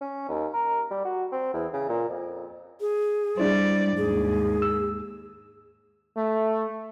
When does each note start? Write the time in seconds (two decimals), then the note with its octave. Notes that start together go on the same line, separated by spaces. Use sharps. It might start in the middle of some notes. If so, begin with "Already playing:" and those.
0.01 C#4
0.29 D#2
0.54 A#4
0.91 G3
1.05 F#4
1.32 C4
1.54 E2
1.73 C#3
1.89 A#2
2.09 F2
2.81 G#4
3.38 G3 D4 E4 C5 D5
3.98 D#2 G#2 G#4
4.62 E6
6.17 A3